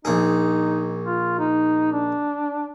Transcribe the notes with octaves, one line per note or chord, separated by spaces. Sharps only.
A#1 D#4 G#4
F4
D#4
D4